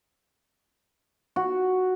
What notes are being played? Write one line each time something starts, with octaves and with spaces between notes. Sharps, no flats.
F#4